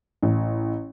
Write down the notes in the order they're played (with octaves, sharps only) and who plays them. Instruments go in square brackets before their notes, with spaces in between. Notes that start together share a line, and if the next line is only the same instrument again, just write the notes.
[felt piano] A1